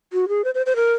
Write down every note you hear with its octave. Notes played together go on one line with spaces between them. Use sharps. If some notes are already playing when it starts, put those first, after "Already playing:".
F#4
G#4
C5
C5
C5
A#4